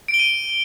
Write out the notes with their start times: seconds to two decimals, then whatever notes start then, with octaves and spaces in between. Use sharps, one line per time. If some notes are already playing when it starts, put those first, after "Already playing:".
0.08 D7
0.14 G7
0.19 D#7